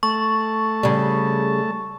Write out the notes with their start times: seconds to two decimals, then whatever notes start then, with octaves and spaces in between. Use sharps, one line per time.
0.03 A3 A5 C#6
0.83 C#3 G3